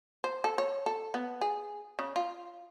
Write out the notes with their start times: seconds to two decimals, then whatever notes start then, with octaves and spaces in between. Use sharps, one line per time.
0.24 C5
0.44 A4
0.58 C#5
0.86 A4
1.14 B3
1.41 G#4
1.99 C#3
2.16 F4